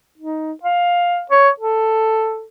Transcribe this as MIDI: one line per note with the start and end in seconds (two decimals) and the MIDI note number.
0.18 0.52 63
0.63 1.22 77
1.31 1.49 73
1.60 2.44 69